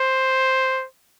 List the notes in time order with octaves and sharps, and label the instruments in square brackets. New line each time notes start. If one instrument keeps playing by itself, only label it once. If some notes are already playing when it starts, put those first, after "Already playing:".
Already playing: [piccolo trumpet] C5